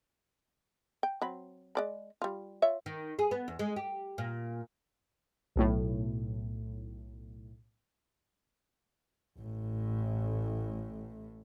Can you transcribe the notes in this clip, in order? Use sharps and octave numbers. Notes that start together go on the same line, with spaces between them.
G5
F#3 C4 B5
G#3 D5 B5
G3 F4
F4 C#5 E5
D#3
G#4
B3
E2
G#3
G4
A#2
B1 A2
A1 A2